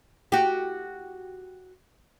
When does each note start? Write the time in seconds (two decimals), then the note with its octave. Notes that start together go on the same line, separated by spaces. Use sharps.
0.32 F#4 G4